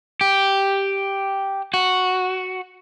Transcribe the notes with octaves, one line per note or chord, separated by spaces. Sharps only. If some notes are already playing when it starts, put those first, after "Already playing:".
G4
F#4